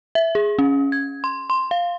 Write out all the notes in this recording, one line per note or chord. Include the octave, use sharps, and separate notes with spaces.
E5
G#4
C#4
G#6
C6
C6
F5